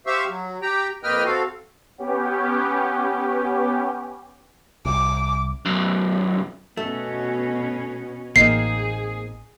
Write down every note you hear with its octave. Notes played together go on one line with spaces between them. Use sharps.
G4 C5 E5 F5 C#6 E6
F#3
G4 G5 A#5
F2 A#3 B4 D#5 G5 F6
C4 F#4 A4 F5
B3 C#4 G4
C2 D6
B1 F#2
B2 A3 C#4
A1 A#3 C4 D#4 G#4 C7